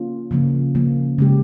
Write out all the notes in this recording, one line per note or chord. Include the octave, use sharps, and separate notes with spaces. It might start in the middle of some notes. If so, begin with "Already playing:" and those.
Already playing: A#3 C#4 F4
C#3 F3 A#3 C#4
C#3 F3 A#3 C#4
C#3 G#3 C#4 G4